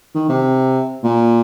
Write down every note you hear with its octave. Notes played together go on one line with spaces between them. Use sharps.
D#3
C3
A#2